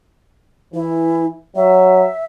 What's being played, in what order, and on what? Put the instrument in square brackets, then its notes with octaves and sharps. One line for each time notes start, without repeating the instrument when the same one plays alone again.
[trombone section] E3 [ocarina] E4
[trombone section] F#3 [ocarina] E5